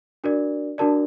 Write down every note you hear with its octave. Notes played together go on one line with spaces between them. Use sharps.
D4 F#4 A#4 D5
D4 F#4 A#4 D5 A5